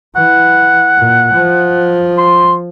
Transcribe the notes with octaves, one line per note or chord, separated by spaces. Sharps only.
E3 F#5
A#2
F3
C6